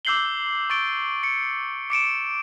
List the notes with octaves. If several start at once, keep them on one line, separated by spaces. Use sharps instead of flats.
D6 E6 G6 C7 F#7 G7
C#6 A6 D7 G7
C#7
D6 C#7 D7 E7